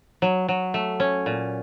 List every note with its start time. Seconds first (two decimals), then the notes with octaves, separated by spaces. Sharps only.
0.22 F#3
0.48 F#3
0.74 A3
1.00 C#4
1.26 A#2